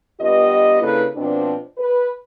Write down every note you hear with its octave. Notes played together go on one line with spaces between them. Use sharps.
G2 B3 F4 G4 D#5
C#3 A#3 D4 E4 A4 B4
B2 F3 C4 D4
B4